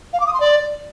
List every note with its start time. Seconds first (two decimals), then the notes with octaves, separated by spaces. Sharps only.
0.13 F5
0.20 D6
0.27 D#6
0.34 C6
0.40 D5